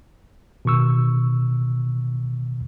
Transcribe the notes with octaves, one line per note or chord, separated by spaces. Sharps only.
B2 D#3 C#6 E6